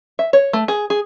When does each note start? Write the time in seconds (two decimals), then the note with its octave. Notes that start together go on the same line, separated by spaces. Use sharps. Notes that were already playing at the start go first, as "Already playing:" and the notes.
0.19 E5
0.33 C#5
0.53 A3
0.68 G#4
0.90 G#4